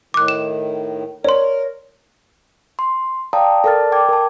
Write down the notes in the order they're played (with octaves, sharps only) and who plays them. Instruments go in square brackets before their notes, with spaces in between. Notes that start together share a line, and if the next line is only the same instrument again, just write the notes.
[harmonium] A2 D#3 [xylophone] D6 F#6
[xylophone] E7
[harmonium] A#4 [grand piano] C#5 [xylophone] D5 C6
[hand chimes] C6
D5 F5 G5 A5 A#5 D#6
A4 A#4 D5 A5 F6 A6
G5 D6 G#6
A#4 A5